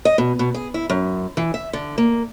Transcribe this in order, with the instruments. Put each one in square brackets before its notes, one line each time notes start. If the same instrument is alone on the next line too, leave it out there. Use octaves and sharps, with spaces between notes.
[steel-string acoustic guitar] D#5
B2
B2
G#4
E4
F#2
E3
E5
D3
A#3